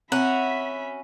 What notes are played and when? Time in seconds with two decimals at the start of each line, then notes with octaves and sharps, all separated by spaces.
0.12 C4 C#4 F#4 E5 F#5 B5